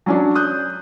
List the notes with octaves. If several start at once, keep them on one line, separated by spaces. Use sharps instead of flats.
F#3 C#4 D4
D#6 F#6 G6